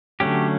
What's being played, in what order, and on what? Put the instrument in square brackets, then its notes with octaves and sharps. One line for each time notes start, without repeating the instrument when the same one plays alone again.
[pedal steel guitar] D3 F#3 A3 C#4 G4